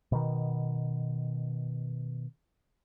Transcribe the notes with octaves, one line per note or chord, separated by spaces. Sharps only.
B2 D#3